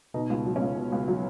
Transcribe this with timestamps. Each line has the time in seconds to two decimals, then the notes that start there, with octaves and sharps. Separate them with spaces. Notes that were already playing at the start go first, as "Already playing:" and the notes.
0.14 B2 D#4
0.30 C#2
0.46 F#3
0.56 C#4
0.61 C#2
0.77 B2
0.92 C#2
1.08 F#3